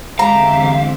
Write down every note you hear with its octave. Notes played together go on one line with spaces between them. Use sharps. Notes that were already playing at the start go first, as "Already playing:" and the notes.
E2 D3 G#3 C4 G4 E5 F5 A#5